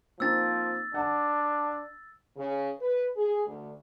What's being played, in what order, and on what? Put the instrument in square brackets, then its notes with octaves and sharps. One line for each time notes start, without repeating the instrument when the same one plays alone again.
[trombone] F3 [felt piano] A#3 C4 D#4 [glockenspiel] E6 A6
[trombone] D4 [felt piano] F#5 A5
[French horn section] C#3
B4
G#4
D2